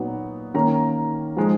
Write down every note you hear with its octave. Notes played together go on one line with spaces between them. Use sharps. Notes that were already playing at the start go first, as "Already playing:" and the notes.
Already playing: A#2 F#3 B3 D#4
D#3 A#3 C#4 A#5
F3 G#3 D#4